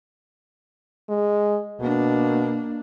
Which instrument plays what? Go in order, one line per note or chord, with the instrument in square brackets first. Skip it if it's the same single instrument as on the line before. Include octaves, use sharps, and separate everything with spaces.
[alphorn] G#3
[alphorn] B2 [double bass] A#3 D4